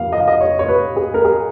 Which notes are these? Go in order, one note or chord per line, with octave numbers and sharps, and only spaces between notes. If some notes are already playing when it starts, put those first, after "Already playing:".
Already playing: F2 A#3 F5
D#5
F5
D#5
C#5
C#5
B4
G#4
A#4
G#4